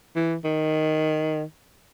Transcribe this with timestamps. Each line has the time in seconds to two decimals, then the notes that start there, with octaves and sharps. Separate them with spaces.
0.16 E3
0.44 D#3